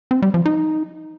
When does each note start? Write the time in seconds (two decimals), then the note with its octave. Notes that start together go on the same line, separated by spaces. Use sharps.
0.11 C4
0.22 G3
0.34 F3
0.46 D#4